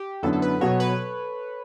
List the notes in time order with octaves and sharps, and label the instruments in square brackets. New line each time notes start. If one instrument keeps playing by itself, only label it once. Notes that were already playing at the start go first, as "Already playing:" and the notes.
Already playing: [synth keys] G4
[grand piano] F#2 D3 F#3 B3 E4 [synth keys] A4
[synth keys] A4
B4
[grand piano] B2 F#3 B3 F#4 [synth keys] C#5
[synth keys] B4